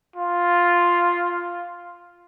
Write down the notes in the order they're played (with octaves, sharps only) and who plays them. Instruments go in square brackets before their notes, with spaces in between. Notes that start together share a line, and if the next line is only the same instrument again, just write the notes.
[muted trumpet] F4